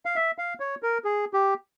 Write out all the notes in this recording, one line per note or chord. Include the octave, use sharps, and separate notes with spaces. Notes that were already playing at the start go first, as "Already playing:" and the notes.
F5
E5
F5
C#5
A#4
G#4
G4